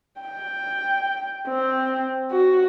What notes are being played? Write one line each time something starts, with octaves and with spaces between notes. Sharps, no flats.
G5
C4
F#4